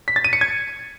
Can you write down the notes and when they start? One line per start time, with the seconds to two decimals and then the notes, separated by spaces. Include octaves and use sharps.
0.08 B6
0.16 A6
0.25 D#7
0.33 C#7
0.41 G#6